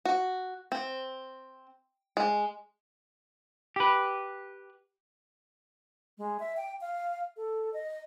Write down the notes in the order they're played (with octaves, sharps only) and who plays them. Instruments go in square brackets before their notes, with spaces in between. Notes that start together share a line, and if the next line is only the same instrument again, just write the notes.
[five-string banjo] F#4
C4
G#3
[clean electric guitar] G4 B4
[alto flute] G#3
E5
G5
F5
A4
D#5